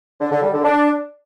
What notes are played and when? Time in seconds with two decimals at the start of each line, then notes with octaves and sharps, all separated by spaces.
0.21 D3
0.32 D3
0.42 G3
0.53 D3
0.64 D4